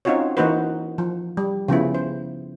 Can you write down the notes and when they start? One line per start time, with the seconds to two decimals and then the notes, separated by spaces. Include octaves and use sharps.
0.05 C4 C#4 D#4 F4 F#4 C#5
0.37 E3 A#3 D#4 F#4 B4 C5
0.98 F3
1.37 G3
1.68 C#3 F3 B3 E4
1.95 C5